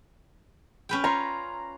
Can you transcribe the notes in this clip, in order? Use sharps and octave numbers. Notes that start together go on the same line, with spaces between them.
C#4 B4 G5
F4 C#5 A#5